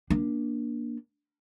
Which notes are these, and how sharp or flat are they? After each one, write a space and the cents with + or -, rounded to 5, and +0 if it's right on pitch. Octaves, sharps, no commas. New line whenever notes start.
A#3 +20 D4 +0